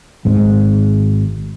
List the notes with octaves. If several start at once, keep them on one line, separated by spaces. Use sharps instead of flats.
G#1 G#2